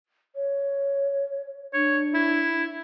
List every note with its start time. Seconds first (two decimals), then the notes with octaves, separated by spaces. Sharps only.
0.35 C#5
1.74 D4 C#5
2.14 E4